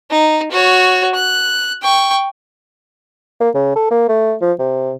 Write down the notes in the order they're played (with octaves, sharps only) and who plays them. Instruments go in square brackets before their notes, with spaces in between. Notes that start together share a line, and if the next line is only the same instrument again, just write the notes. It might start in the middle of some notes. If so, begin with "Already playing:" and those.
[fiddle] D#4
F#4 C#5
F#6
G5 C#6
[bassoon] A#3
C#3
A4
A#3
A3
F3
C3